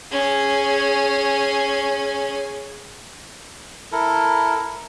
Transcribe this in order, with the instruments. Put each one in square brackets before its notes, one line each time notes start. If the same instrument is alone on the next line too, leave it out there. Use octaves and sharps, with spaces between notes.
[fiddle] C#4 G#4
[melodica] E4 A4 A#4